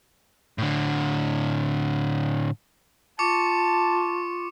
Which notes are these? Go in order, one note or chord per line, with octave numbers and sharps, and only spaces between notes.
A2 D3
F4 A5 C#6 D6 C#7